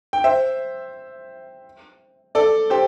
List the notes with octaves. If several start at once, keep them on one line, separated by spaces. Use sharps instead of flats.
G5
C5 E5
A4 D5
G4 C5